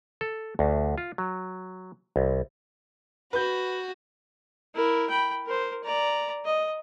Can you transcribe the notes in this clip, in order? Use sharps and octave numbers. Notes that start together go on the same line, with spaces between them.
A4
D2
F4
F#3
C2
F#4 B4 G6
E4 A#4
G5 B5
A#4 C5
D5 A#5
D#5